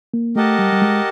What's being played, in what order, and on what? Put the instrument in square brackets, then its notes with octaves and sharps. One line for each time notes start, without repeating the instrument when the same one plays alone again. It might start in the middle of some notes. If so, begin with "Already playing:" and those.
[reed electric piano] A#3
[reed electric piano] A3 [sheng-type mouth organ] G4 A#4 D#5 F#5 A5
[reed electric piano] G3
G3
G#3